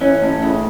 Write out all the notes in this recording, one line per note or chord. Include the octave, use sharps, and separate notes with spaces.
E3 C#4
A2
C#3